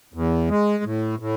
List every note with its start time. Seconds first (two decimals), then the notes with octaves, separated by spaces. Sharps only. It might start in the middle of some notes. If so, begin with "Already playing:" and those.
0.14 E2
0.49 G#3
0.84 A2
1.19 A2